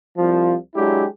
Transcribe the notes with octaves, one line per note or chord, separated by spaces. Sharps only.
C2 F3
F#3 G#3 D4 E4 G4